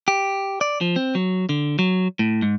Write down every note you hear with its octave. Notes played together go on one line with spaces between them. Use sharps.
G4
D5
F3
C4
F#3
D3
F#3
A2
G#2